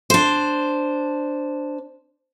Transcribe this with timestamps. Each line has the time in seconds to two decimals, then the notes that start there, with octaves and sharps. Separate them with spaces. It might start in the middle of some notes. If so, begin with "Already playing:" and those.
0.10 D4 C5